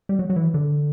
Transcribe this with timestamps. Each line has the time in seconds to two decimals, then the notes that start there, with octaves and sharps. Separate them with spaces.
0.09 G3
0.19 F#3
0.30 F#3
0.36 E3
0.54 D3